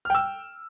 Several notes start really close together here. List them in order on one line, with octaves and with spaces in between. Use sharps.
F6 G5 E6